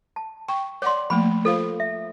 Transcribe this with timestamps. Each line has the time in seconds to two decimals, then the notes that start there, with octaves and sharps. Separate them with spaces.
0.16 A5
0.49 G5 C#6
0.82 C#5 D5 F#5 C6 D6
1.10 F3 A3 A#3 B5
1.45 F4 A4 C5 F5
1.80 E5